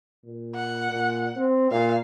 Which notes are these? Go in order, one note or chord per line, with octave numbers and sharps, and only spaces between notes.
A#2
F#5
A#2
C4
A#2 F5